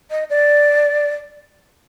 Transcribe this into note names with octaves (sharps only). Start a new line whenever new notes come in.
D#5
D5